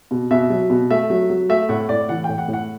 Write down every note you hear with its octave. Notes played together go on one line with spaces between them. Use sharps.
B2
B2 E5
F#3
B2
A3 E5
F#3
F#3
A3 E5
A2 F#5
A2 D5
E3 F#5
A2 G5
F#5
A2
F#5